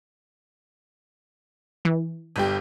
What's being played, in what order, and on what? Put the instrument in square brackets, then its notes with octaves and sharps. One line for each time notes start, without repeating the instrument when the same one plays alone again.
[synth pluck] E3
[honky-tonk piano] G1 G3 G4